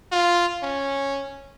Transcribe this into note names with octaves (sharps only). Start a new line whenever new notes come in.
F4
C#4